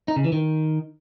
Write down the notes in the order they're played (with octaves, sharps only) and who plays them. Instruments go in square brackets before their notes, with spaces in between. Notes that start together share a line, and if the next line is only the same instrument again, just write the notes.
[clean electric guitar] D#4
C#3
E3
D#3